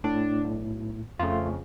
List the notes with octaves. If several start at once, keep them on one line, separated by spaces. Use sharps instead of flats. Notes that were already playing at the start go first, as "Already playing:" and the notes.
A2 D4
B1
F2 C#3 A3 F4